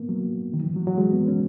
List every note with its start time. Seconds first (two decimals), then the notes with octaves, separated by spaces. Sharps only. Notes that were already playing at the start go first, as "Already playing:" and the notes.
Already playing: A#3 B3
0.09 F#3
0.54 D#3
0.64 E3
0.76 F#3
0.87 F#3
0.98 G#3
1.13 B3
1.28 C#4